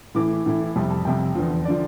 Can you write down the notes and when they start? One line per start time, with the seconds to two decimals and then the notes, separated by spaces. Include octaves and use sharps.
0.15 A2 E3 A3 E4 D6
0.46 A2 E3 A3 E4
0.76 F2 C3 G3
0.90 A5
1.05 F2 C3 G3 G5
1.35 E2 D3 F3
1.65 D3 F3 D5